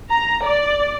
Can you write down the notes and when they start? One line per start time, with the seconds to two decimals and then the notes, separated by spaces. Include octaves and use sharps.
0.11 A#5
0.43 D5